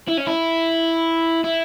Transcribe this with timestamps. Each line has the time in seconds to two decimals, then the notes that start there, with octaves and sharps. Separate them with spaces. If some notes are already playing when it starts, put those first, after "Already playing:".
0.08 E4
0.17 C#4
0.27 E4
1.44 E4